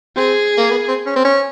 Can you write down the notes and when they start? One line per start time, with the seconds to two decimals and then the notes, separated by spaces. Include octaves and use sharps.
0.17 C4 G#4
0.57 A#3
0.71 B3
0.88 C4
1.06 C#4
1.16 C4
1.25 C#4